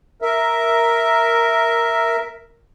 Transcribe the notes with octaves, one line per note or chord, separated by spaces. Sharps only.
A#4 E5